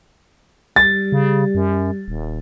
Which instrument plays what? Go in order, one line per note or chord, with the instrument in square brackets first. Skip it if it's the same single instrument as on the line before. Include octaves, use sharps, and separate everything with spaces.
[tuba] G3 [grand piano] A6
[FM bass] C#3
F#2
D#1